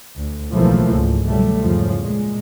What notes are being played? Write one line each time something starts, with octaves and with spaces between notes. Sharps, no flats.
D2
B1 C#3 E3 F3 A3 A#3
C#2 G#2
B2 D3 F#3 G3 A3
E2 G#2 C#3 F3
A#2 G#3